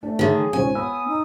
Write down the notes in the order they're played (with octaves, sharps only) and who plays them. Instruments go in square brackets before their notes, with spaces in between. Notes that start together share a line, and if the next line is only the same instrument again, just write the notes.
[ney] A3 [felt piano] D4
[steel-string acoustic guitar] D3 D#3 [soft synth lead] G#4 [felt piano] C#5 E5
[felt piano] C#2 D#3 C5 [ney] C#4 [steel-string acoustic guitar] G#5
[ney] B3 [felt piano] C#5 B5 E6 [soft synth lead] D#6
[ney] D#4